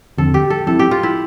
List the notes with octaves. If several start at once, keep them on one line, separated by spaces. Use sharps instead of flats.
E2 D3 F3 C4 A4
G4
A4
F3 C4 E4 A4
G4
F4
E4